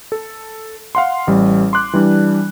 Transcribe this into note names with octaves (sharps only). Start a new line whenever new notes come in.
A4
F5 F#5 C6
A1 G3
C6 D6 F#6
E3 G3 D4